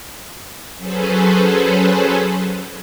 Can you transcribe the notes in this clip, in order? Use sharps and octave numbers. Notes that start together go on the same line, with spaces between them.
F#3 C#4 G#4 A4 B4 C5